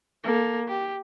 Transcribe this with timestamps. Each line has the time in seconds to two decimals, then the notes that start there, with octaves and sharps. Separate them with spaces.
0.23 A#3 A4
0.67 G4